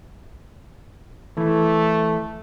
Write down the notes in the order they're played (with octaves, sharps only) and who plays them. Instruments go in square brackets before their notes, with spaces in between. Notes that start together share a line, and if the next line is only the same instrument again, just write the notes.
[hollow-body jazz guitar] E3 [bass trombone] A3